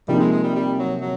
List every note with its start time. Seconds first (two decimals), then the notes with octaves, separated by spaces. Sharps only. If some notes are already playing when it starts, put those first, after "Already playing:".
0.08 C3 F3 G3 A#3 D#4 G#4
0.20 G#3
0.32 G#3
0.43 G3
0.55 G3
0.79 F#3
1.01 F#3